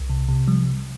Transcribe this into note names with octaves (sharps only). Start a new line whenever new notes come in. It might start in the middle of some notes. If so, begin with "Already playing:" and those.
Already playing: C2
C3
C3
F3 G3